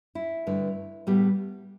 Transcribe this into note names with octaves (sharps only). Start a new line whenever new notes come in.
E4
G2 D3 A3
A2 G3 B3